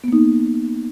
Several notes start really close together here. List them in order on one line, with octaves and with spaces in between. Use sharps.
B3 A#3 D#4